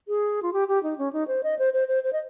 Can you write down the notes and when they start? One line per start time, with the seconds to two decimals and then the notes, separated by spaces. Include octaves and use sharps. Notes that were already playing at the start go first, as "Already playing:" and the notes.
0.08 G#4
0.43 F4
0.53 G4
0.68 G4
0.83 D#4
0.98 C#4
1.13 D#4
1.28 C5
1.43 D#5
1.59 C5
1.74 C5
1.88 C5
2.04 C5
2.13 D#5